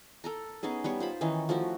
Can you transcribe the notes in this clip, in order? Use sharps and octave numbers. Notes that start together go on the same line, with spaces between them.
A4 A#4 A#5
B3 C#4 D#4 G#4
G3 B3 C#5
F4 C5 B5
D#3 E3 C#4 D#4
F3 A3 E4 F#4